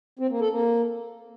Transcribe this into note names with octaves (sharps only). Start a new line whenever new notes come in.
C4
A#3
A4
A#3